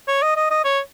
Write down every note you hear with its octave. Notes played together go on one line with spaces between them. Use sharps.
C#5
D#5
D#5
D#5
C#5